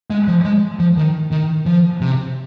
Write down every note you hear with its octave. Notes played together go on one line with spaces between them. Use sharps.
G#3
F3
G#3
F3
D#3
D#3
F3
C3